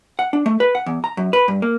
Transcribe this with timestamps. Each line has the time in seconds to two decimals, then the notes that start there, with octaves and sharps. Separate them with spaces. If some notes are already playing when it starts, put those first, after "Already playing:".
0.19 F#5
0.33 D4
0.46 A3
0.60 B4
0.75 F#5
0.86 E2
1.04 A#5
1.17 F#2
1.33 B4
1.48 G2
1.62 A#3